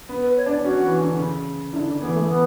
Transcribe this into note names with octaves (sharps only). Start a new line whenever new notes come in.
B3
B4
C#5
D4 D5
C#4 F#4
E3
D3
C#3
D3 E4
D4
E3 B3
A3
B3